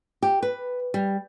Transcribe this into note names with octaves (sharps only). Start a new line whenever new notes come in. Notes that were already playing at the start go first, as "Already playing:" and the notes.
G4
B4
G3